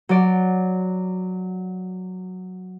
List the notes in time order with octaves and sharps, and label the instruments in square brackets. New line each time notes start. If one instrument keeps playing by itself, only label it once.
[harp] F#3 D5